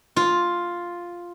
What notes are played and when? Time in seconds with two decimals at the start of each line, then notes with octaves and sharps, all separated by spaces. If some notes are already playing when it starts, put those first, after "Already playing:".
0.16 F4